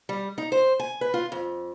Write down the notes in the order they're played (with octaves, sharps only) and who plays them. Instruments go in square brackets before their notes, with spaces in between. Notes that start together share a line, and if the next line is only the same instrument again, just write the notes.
[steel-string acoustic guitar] G3
D#4
C5
G#5
B4
F4
F2